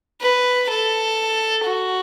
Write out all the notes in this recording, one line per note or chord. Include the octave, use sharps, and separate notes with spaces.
B4
A4
F#4